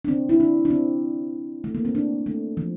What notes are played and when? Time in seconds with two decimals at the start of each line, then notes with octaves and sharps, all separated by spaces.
0.05 D4
0.08 C4
0.29 E4
0.40 D4
0.65 D4
0.71 C4
1.64 A3
1.75 A#3
1.85 C4
1.95 D4
2.26 A3
2.57 F3